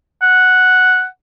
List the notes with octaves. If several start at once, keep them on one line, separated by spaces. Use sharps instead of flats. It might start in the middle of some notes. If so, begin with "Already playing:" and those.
F#5